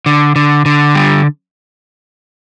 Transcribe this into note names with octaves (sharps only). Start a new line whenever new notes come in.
D3
D3
D3
G3